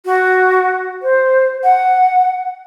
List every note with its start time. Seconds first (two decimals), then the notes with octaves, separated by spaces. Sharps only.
0.05 F#4
1.02 C5
1.63 F#5